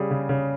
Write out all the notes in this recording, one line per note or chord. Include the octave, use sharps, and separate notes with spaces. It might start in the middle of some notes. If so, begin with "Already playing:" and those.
Already playing: C#3 G3 G#4
C#3
C#3